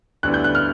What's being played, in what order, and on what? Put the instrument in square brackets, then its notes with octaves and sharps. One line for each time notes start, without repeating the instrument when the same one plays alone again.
[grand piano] D2 D3 G3 B3 E4 [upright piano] F#6
[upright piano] G6
F#6
F6